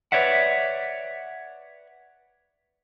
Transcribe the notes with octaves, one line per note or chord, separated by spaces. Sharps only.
B4 C#5 D5 E5 F#5